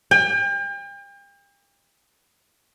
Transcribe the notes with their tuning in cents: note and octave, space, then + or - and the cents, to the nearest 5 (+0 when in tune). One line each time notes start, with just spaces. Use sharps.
G5 +40